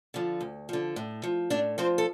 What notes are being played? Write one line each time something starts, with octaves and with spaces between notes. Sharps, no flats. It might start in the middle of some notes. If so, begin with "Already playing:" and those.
D3 F3
D2
D3 F3
A2
F3
A2 D4 D5
F3 C4 C5
A4